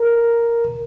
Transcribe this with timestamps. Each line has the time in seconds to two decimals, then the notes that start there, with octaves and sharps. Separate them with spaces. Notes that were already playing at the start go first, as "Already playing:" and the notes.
Already playing: A#4